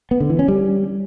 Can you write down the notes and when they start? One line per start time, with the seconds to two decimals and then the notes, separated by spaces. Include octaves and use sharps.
0.11 B3
0.20 D3
0.30 E3
0.39 C#4
0.48 G3